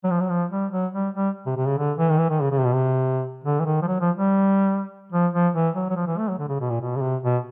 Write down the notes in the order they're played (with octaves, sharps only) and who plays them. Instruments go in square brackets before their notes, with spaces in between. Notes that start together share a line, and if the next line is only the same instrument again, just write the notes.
[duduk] F#3
F3
F#3
F3
G3
F#3
G3
G3
C3
C3
C#3
D3
E3
D#3
E3
D#3
C#3
C#3
C3
B2
C3
D3
E3
D#3
F3
F#3
F3
G3
F3
F3
E3
F#3
F#3
F3
E3
A3
F#3
D3
C#3
B2
A#2
B2
C#3
C3
B2